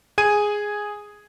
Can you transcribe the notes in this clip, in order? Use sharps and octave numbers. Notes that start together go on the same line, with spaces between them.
G#4 G#5 G#6 D#7